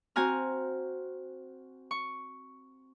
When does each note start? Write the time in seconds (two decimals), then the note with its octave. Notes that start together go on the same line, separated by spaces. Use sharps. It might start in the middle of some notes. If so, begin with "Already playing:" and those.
0.16 C4 F#4 G#5 A#5 F6
1.91 C#6